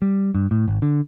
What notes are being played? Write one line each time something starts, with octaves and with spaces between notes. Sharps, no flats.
G3
G2
A2
G#1
D3